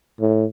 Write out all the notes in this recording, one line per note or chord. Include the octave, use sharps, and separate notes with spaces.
A2